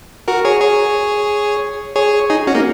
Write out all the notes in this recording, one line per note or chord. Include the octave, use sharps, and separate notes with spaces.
F#4 A#4
G#4 C#5
G#4 C#5
G#4 C#5
D#4 G#4
C#4 F#4
A#3 D#4